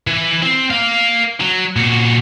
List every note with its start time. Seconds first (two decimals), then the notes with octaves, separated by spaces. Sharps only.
0.07 E3
0.42 C4
0.71 A#4 F5
1.40 F#3
1.76 A#2 F#4